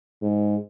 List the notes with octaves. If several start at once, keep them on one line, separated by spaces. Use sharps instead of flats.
G#2